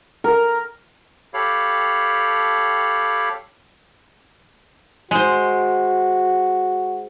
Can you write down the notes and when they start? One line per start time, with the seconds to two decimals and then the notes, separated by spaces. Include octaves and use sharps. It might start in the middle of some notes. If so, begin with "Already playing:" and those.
0.24 A#4
1.34 G4 A4 C#5 F5 B5
5.11 G#3 F#4 C5